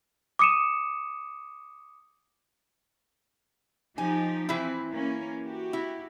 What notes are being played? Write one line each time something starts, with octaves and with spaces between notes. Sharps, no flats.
D6 D#6 C#7 D#7 E7
F3 D#4 G4 G#5
E3 C4 E4
A#3 C#4
F#4 G4
E4